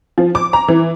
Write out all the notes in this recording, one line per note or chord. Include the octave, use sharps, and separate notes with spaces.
F3
D6
A#5
E3